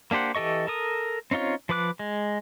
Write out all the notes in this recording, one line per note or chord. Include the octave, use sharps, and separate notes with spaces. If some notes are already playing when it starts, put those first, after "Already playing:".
A#3 D4 G4 C5 F#5
E3 G4 A4 D#5 C#6
A4 A#4 D#6
C4 C#4 D#4 F4 C#5
F3 B4 D6 F#6
G#3